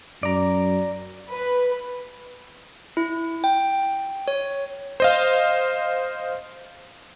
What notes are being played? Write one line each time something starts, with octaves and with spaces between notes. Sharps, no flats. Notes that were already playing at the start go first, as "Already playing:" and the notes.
F#2 D5 A#5
B4
E4
G5
C#5
C5 D#5 F5